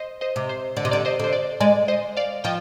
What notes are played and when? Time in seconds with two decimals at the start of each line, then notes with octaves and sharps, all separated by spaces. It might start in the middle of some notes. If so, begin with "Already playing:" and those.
Already playing: C5 D#5
0.21 C5 D#5
0.36 C3
0.49 C5
0.77 D3 D5
0.85 C3 D#5
0.91 D3 D5
1.05 C5 D#5
1.20 D3 C5
1.33 D5
1.60 G#3 D5
1.88 C5 D#5
2.17 D5 F5
2.44 F3 D#5 G5